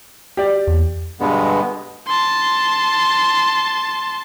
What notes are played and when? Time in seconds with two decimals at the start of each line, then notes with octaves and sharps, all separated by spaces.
0.37 G4 D5
0.67 E2
1.20 G2 B2 D3 G#3 B3
2.07 A5 C6